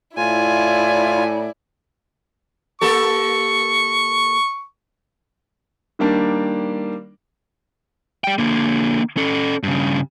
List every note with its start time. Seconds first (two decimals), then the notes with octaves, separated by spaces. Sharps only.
0.17 A2 E4 F4 D5 G#5
2.81 A#3 G4 A4 C#6
5.99 D#3 G3 A#3 D4
8.24 G3 G5
8.38 D3 A#3
9.17 C#4 A4
9.63 G2 C#3